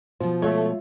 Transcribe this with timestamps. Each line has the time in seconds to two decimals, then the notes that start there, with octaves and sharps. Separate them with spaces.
0.20 B2 F3 F4 C5
0.42 G#3 A3 F4 C#5 E5